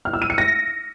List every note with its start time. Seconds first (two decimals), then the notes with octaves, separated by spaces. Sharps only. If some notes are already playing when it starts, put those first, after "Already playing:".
0.05 F6
0.13 E6
0.22 D#7
0.30 C#7
0.38 A#6